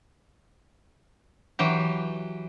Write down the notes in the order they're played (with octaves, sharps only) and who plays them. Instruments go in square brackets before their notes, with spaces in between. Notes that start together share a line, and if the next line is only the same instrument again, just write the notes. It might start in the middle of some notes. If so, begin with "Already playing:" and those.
[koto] E3 F#3 G4